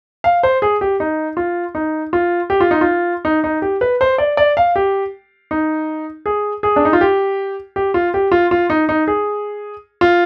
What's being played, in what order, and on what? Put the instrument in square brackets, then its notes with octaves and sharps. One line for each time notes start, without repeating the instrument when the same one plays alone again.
[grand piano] F5
C5
G#4
G4
D#4
F4
D#4
F4
G4
F4
D#4
F4
D#4
D#4
G4
B4
C5
D5
D5
F5
G4
D#4
G#4
G#4
D4
D#4
F4
G4
G4
F4
G4
F4
F4
D#4
D#4
G#4
F4